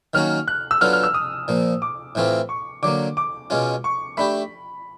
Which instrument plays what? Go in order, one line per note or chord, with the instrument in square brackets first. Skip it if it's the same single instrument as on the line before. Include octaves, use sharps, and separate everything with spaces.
[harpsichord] D#3 F#3 A#3 C#4 F#4 [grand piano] F6
[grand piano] F#6
E6
[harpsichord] F#3 B3 D4 F4 A4 [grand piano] F6
[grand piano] F6
E6
D#6
[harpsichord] A#2 F3 A#3
[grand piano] D6
[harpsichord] A2 E3 A3 C4 F4
[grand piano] C#6
[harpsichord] D3 F#3 A#3 [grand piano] D6
[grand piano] D6
[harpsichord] B2 G#3 C#4 F4
[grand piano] C#6
[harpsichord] A3 D4 G4 [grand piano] B5